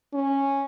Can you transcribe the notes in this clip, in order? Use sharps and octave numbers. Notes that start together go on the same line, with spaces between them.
C#4